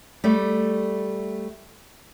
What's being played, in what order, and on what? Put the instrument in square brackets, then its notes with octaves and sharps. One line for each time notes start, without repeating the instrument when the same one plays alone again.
[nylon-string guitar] G3 A3